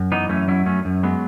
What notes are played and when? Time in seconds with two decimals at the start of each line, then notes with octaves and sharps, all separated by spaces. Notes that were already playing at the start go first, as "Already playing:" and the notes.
Already playing: F#2
0.12 E3 B3 D#4
0.29 F#2 A3 C#4
0.48 F#3 C#4 E4
0.66 F#2 A3 C#4
0.85 F#2
1.03 F#3 G#3 B3